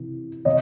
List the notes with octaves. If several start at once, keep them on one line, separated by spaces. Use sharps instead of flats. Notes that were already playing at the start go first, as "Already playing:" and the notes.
Already playing: C3 E3
C3 C#5 D#5